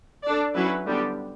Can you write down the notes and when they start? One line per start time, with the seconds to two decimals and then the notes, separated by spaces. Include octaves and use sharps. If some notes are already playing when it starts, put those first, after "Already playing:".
0.24 D4 A4 D5
0.55 F#3 C#4 E4 B4
0.86 D3 G3 B3 D4 G4